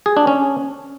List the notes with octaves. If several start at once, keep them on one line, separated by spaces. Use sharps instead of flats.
G#4
D4
C#4